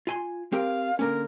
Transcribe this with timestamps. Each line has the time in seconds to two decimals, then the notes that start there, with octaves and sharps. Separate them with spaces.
0.07 F4 G#5 C6
0.52 C4 G4 A#4 F5
0.99 D3 A#3 C#4 A#4